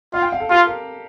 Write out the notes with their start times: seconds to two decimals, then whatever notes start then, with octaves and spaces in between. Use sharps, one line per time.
0.13 F4 F5
0.22 G5
0.32 F5
0.40 A4
0.50 F4 G4
0.67 A#4